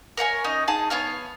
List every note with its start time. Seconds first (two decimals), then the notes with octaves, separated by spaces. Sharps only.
0.17 A#4 C#5 F#5 G#5
0.44 C#4 D#4 D#5
0.68 D#4 G#4 A5
0.90 B3 C#5 F5 F6